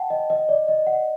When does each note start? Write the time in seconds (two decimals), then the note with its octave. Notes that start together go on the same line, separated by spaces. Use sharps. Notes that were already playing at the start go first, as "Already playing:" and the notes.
Already playing: F#5 G5 A5
0.10 D#5
0.30 D#5
0.49 D5
0.68 D#5
0.87 F#5